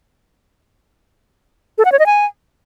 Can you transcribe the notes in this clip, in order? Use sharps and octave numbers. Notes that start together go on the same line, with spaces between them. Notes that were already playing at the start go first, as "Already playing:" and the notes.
A4
F#5
C#5
D#5
G#5